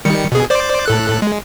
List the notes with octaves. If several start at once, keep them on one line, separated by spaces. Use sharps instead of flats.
D#3 G3 C#7
B2 G#4
C5 D5 D6
A2 A4 F#6
G#3